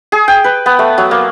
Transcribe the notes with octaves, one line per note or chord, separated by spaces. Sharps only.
G#4
G5
B4
B3
A3
F#3
A#3